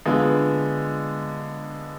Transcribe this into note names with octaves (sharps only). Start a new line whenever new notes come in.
D3 G#3 B3 F4